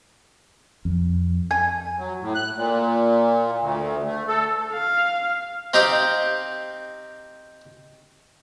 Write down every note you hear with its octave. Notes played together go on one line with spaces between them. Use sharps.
F2
G#5
F#3
A2
F#6
A#2
D2
A3
A4
F5
C4 D#4 G4 F5